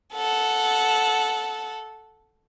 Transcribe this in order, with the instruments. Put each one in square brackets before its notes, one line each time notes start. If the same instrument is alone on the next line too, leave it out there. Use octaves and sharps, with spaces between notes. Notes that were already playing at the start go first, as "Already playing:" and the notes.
[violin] A4 F#5